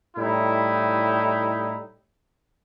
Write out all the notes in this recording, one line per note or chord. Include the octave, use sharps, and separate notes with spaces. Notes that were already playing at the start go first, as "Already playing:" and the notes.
A2 G3 D#4 E4